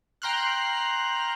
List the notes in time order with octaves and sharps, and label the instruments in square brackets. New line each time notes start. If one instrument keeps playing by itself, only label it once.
[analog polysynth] G5 A#5 C6 F6 F#6